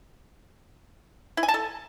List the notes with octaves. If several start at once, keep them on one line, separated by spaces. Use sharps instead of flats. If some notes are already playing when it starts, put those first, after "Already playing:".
E4
G#5
A5
A4